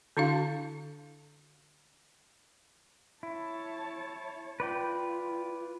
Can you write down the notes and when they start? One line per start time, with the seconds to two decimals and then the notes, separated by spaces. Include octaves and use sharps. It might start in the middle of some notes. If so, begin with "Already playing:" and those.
0.17 D3 D4 E4 F#4 F5
3.23 E4 C#5 A5
4.60 F4 B4 D5 G5